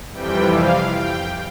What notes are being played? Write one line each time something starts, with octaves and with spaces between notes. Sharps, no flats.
F2 C3 E3 G3 G5
F5
G5